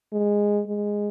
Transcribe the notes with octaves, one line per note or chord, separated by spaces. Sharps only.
G#3
G#3